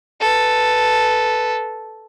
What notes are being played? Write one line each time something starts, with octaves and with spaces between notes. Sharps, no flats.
A4 B4